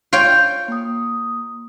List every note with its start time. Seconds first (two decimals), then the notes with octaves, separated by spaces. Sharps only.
0.13 F4 C#5 G5
0.68 A#3 D#6